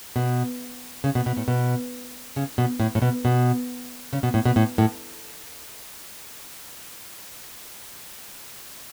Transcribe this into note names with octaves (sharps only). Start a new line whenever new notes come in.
B2
C#3
B2
B2
A2
B2
C#3
B2
A2
A2
B2
B2
C#3
B2
A2
B2
A2
A2